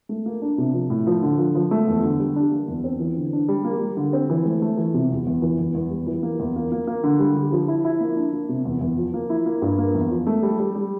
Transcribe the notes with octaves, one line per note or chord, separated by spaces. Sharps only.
A3
A#3
D4
C3
F3
A2
F3
D3
F3
F3
A3
E2
D3
G3
D4
A#3
E2
C4
E3
D3
D4
G3
A#3
G3
D3
C4
E3
A3
A3
E3
C3
E2
E2
E3
E2
E2
G3
E3
A#3
E2
A#3
A#3
A#3
D3
G3
D3
F3
E4
E4
A#3
D4
A#3
C3
E2
E2
F3
A#3
E4
A#3
G2
A#3
E2
F3
A3
G3
G3
G3